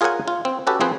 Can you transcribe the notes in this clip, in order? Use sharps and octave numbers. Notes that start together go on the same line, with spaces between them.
F4 G#4 A#4 C#5 F#5 G#5
F4
C4
C#4 F#4 G4 A4 B4
F3 C4 G#4 B4 C5